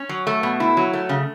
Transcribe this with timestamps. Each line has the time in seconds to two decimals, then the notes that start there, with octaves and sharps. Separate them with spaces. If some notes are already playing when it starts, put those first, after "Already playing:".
Already playing: C#4
0.09 F#3
0.27 A3
0.43 B2
0.60 E4
0.77 F#3
0.93 A3
1.09 C#3